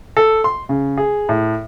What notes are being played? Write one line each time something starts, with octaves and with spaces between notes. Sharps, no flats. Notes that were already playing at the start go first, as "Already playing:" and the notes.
A4
C6
C#3
G#4
A2